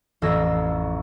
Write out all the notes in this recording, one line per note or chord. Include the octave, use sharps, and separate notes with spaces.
A1 F2 D#6 E6 G#6 A#6